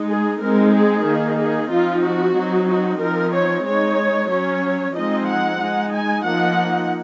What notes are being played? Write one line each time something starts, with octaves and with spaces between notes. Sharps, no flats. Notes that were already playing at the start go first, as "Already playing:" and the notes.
Already playing: G#3 D#4
G#4
G#3 C4 D#4 A#4
G#4
D#3 A#3 D#4
G#4
F3 C4 D#4 F4
F#4
F#3 C4 D#4
F#4
F3 C4 D#4 A#4
C#5
G#3 D#4 C#5
F#3 C#4 C#5
F3 G#3 C4 D#4 D#5
F#5
G#3 D#4
G#5
F3 A#3 D#4 F#5